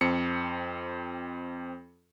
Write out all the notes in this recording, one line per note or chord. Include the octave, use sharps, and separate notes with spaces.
F2 C4 C#7